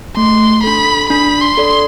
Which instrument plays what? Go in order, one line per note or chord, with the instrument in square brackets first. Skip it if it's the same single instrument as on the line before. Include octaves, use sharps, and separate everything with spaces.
[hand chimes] A3 [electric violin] C6
[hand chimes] D4 A4 [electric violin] B5
[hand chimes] D4 [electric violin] B5
[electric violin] C6
[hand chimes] A4 D5